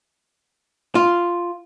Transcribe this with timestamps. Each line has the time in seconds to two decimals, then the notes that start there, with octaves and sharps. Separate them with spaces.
0.95 F4